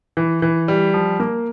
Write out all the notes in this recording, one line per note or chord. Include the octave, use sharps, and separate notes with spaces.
E3
E3
G3
F3
A#3